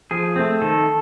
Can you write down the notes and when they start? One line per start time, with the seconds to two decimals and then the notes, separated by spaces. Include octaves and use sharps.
0.11 F3 G#4
0.36 A3 C4
0.62 D#3 A4